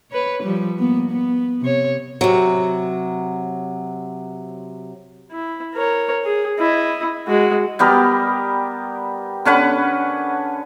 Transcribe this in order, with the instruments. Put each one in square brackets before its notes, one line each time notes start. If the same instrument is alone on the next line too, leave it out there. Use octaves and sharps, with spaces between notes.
[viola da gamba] B4 C#5
F3 G3
A#3 B3
B3
C3 C#5
[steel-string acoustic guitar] C3 F#3
[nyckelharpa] E4
A#4 C#5
G#4
E4 D#5
G#3 F#4
[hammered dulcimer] G3 B3 G4 A#4
D3 C#4 B4 F#5